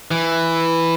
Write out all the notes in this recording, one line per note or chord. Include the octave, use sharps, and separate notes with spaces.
E3